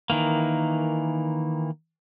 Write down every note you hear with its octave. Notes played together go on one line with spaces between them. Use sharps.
D#3 E3 A#3